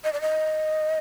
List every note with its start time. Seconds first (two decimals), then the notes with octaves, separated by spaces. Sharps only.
0.04 D#5
0.13 D5
0.21 D#5